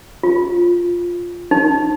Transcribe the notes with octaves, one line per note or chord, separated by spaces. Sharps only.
F4
D#4